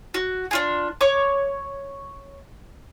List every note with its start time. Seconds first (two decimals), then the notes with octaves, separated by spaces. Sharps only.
0.14 F#4
0.51 D4 F4 G#4
1.01 C#5 C#6 D6